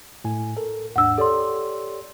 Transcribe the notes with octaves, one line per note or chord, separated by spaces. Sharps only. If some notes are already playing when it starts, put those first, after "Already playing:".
A2 G#5
A4 A#4
D#2 G#2 D4 F#5 E6
G4 A4 C#5 D5 C6